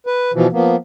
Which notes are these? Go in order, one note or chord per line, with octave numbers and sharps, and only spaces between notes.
B4
B2 E3 F3
F3 A#3 B3